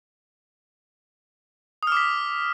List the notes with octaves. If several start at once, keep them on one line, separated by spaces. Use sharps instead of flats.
D6 D#6 F6 B6